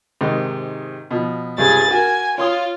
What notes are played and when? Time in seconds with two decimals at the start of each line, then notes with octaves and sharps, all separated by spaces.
0.21 G#2 C3 D#3
1.11 B2 F3
1.58 C#2 G2 C3 G#4 A6
1.91 F#4 A#4 G#5
2.38 F4 C#5 C6 D#6